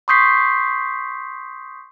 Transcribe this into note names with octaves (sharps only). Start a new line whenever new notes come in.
C6 C#6 D#6 G6 B6 C7